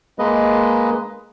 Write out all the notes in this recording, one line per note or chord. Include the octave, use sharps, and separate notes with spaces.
G#3 A#3 B4 D#5